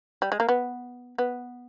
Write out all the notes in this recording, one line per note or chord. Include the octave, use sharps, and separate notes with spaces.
G3
G#3
A#3
B3
B3